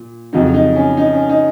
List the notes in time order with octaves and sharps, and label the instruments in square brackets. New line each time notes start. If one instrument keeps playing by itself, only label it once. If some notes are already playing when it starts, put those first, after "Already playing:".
Already playing: [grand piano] A#2
[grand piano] F2 C#3 F#3 [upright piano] D#4
[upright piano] D#4
C#4
D#4
C#4
D#4